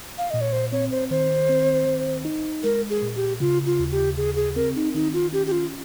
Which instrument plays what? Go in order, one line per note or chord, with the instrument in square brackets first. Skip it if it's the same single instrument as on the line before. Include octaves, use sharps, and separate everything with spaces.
[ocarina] F5
[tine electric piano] A#2 [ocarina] D#5
[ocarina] C#5
C5
[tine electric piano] C4 [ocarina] C#5
[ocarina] C5
[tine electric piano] D#3 [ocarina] C5
[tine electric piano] C4
D#3
D#4
[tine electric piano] G#3 [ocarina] A#4
[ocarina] G#4
[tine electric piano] A#2
[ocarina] G4
[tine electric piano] C#3 [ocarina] F4
[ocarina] F4
[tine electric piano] D#2
[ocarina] G4
[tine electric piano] C#3 [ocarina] G#4
[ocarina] G#4
[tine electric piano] C4 [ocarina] A#4
[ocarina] D#4
[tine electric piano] D#3 [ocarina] D#4
[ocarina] F4
[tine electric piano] C#4 [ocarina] G4
[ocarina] G4
F4